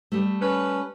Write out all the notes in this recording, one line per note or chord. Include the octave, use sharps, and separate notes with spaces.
G3 A3
C#4 B4